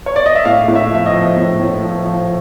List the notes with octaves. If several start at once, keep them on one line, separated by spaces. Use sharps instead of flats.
C#5
D5
D#5
E5
A2 F5
A2
E5
F3 E5
D#5
F3
A2
A2
F3
F3